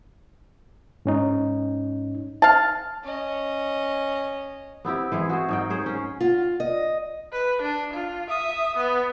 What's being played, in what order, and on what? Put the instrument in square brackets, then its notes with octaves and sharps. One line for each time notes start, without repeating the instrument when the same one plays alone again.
[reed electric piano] G#2 C#4 D#4
[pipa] F5 A5
[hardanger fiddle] C#4 D#5
[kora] B3 C4 E4 G4
E3 G#3 G#4
F#4 G#4 C5
G#2 D#4 G5
G#4 C5 C#5
C#4
[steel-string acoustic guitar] F4
D#5
[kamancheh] B4
D4
F4
E5 D#6
B3